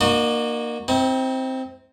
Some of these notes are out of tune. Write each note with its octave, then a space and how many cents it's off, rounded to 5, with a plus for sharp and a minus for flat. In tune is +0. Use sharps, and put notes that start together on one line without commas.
A#3 +5 D#4 -40 F#4 -20
C4 +0 D#4 +45